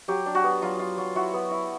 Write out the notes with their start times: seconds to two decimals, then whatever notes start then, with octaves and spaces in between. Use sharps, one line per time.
0.08 F#3 G4
0.26 D4
0.35 F#4
0.44 B3
0.62 F#3 F4
0.79 F4
0.98 F#3
1.15 E4 F#4
1.34 B3
1.51 E4